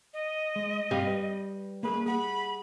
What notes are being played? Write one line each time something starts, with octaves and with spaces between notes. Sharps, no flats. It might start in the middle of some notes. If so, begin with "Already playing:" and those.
D#5
G#3
G2 G3 C4 F5
B4
A#3 G#4 A#4 B4
G#4 F#5 B5